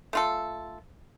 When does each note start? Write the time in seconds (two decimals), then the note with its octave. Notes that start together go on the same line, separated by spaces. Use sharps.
0.13 A3 F4 A4